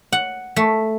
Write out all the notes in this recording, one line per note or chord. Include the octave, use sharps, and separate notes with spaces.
F#5
A3